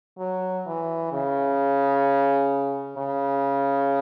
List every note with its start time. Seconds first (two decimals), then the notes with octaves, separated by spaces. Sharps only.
0.19 F#3
0.66 E3
1.12 C#3
2.98 C#3